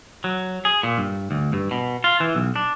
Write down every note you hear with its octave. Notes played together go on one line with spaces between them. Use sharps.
F#3
G#4
A#2
G2
D2
G2
B2
F4
E3
B1
D4